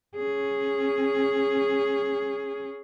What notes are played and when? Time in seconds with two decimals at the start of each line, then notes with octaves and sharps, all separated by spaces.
0.16 C#4 G#4